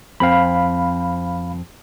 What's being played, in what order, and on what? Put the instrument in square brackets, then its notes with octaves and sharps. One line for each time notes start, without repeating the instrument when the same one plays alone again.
[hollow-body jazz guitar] F2 C4 [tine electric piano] F5 B5